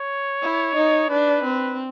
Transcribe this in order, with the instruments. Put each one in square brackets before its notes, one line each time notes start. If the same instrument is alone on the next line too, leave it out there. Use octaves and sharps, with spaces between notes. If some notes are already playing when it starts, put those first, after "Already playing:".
Already playing: [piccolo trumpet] C#5
[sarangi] E4
D#4
[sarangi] D4 [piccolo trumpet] B4
[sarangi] C4